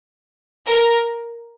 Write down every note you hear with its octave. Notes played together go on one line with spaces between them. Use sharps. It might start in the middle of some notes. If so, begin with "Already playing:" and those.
A#4